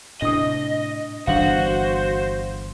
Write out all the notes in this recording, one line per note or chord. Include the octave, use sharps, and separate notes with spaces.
A2 C3 D4 D#5 D#6
G1 E3 D4 F#4 C5 F5 F#5 F#7